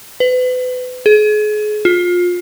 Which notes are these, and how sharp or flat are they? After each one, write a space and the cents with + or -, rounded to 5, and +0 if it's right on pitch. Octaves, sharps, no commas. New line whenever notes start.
B4 +35
G#4 +35
F4 +25